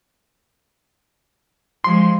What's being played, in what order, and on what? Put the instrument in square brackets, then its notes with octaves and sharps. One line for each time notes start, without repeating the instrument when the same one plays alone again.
[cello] F3 G#3 [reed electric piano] C6